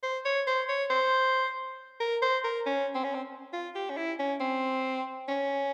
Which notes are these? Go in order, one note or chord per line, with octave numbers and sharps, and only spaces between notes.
C5
C#5
C5
C#5
C5
A#4
C5
A#4
C#4
C4
C#4
C4
F4
G4
C#4
E4
C#4
C4
C#4